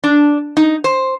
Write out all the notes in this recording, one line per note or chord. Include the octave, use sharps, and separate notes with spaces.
D4
D#4
C5